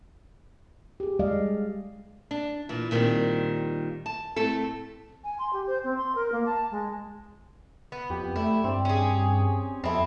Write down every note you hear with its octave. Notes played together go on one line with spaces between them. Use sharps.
G4 G#4
G3 G#3 D5 D#5 F5
D4
A#2 E3
A#2 D#3 G3 C4
A5
A2 A3 C4 A4
G#5
C6
G4
C5
C4
C6
A#4
A#3
A5
G#3
B3
F2 G4
A3 E4 D5
G2 C4 D5
C#4 G#4
F2 B3 C4 E4 A4 C5